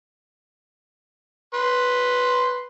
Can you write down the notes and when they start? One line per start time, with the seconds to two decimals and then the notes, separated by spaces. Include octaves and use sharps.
1.54 B4 C6